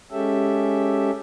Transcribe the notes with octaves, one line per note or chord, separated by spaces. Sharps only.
G#3 C#4 G4 A4 E5